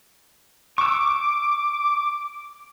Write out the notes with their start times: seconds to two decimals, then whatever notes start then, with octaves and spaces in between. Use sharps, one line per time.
0.78 C#6 D6 E6